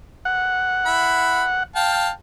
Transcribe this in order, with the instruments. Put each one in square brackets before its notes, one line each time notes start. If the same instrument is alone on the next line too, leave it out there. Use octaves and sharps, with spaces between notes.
[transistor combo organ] F#5
[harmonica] E4 B5
F5 G5 A5